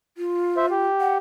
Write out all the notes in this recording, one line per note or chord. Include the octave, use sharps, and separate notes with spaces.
F4
C5 E5
G4
F#5